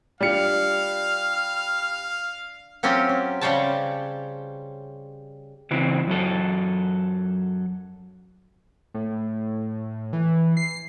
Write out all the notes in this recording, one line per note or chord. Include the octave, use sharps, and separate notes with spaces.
G3 D4 F4 D5 F5 F6 C#7
F#3 C4 C#4 F4 G4
C#4
C#3 G3 C5 C#5 G5 A5
C#3 E3 C4 E4
F#2 F#3 A4
A2
E3
C7